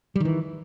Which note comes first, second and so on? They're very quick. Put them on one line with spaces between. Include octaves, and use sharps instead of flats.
G3 D#3 E3